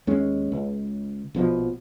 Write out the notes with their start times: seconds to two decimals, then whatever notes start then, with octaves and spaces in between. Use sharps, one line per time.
0.07 D#2 G#3 C#4
0.52 C#2
1.35 A#1 B2 F3